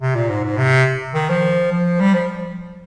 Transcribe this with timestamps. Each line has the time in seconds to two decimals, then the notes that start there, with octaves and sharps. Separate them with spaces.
0.01 C3
0.15 A#2
0.29 G#2
0.44 G#2
0.57 C3
1.14 D#3
1.29 F3
1.72 F3
2.00 G3
2.14 F3